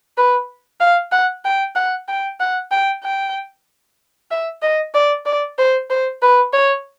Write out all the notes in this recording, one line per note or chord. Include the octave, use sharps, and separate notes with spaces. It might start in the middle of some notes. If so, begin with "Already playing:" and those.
B4
F5
F#5
G5
F#5
G5
F#5
G5
G5
E5
D#5
D5
D5
C5
C5
B4
C#5